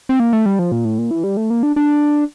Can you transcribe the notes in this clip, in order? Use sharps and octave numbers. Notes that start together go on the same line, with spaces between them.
C4
A#3
A3
G3
F3
A#2
A2
A#2
E3
G3
A3
A#3
D4
D4